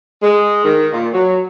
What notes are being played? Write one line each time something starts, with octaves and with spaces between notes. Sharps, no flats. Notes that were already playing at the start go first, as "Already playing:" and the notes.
G#3
D#3
A#2
F#3